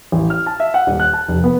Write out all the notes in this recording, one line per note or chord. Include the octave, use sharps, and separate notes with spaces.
A1
F6
A5
E5
F#5
D#1
F#6
A5
F1
B3